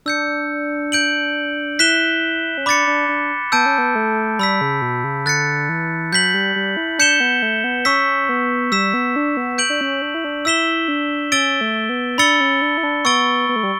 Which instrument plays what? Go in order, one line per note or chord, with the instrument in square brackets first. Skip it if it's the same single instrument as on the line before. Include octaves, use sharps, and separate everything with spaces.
[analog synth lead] D4 [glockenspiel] E6 G6 C#7
[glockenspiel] G6 D7 F#7
[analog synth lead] E4 [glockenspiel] F#6 B6 E7 G7
[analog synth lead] C#4
[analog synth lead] D4 [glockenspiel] B5 D6 A6 C#7
[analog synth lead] D4
D4
[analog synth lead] B3 [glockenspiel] A5 E6 G6 D7
[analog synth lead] C#4
B3
A3
[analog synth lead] G3 [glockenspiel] B5 E6 B6
[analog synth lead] C#3
B2
C#3
[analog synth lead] D3 [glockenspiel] F#6 A6 C#7
[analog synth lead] E3
[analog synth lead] F#3 [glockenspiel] G6 B6 F#7
[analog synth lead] G3
G3
E4
[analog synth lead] D4 [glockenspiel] G6 C#7 E7 G7
[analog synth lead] B3
A3
B3
[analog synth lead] C#4 [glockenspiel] C#6 E6 B6
[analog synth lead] B3
[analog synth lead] G3 [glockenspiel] E6 B6 E7
[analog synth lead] B3
D4
B3
[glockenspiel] G6 D7 F#7
[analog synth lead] D4
C#4
D4
E4
D4
[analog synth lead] E4 [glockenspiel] E6 B6 E7 G7
[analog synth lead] D4
[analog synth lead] C#4 [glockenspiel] E6 A6 D7 G7
[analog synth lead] A3
B3
[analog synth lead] D4 [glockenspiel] B5 E6 A6 C#7 G7
[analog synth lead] C#4
D4
E4
D4
[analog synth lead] B3 [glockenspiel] C#6 E6 A6 D7 G7
[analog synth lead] B3
A3
G3